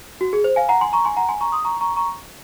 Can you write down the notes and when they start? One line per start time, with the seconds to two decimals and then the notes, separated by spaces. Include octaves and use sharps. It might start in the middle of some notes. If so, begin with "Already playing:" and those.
0.21 F#4
0.33 G#4
0.44 C5
0.56 F5 G#5
0.69 F#5 A#5
0.81 G#5 C6
0.93 A#5 C#6
1.05 G#5 C6
1.17 F#5 A#5
1.29 G#5 C6
1.41 A#5 C#6
1.52 C6 D#6
1.65 A#5 C#6
1.81 A#5 C#6
1.96 A#5 C#6